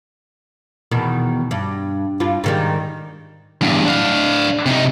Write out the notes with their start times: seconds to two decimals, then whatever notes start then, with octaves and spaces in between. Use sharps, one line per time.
0.91 E2 B2 D#3
1.51 G2
2.20 G2 F4
2.44 G#2 D#3 G3
3.61 E2 G2
3.86 D4 F5
4.66 C3 D#4